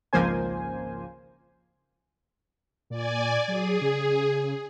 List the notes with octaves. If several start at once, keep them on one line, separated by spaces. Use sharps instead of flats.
G#1 C#2 F3 A#3 C5 G#5
A#2 D5 G#5
F#3 G#4
C#3